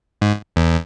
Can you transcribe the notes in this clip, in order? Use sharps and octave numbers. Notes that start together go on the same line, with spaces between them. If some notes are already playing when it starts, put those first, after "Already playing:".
G#2
E2